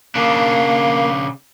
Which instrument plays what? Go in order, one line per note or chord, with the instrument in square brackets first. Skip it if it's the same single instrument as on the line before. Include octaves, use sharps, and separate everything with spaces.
[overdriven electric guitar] C#3 D4 [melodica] A#3